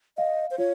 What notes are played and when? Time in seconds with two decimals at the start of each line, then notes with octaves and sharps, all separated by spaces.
0.17 D#5 F5
0.51 C5
0.58 F4 C#5